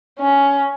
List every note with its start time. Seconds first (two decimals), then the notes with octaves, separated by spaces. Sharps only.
0.19 C#4